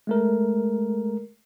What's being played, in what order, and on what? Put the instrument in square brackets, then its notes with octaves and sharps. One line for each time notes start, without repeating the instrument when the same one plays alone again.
[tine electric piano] G#3 A3 A#4